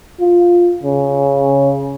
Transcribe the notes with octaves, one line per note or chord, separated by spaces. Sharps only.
F4
C#3